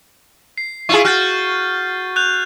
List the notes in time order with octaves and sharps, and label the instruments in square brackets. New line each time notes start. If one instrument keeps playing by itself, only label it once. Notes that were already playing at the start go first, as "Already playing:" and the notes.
[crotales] C7
[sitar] E4 F4 G#4 [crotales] C#6
[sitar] F#4 [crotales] F6 G6 A6
[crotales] F#6 G6 F7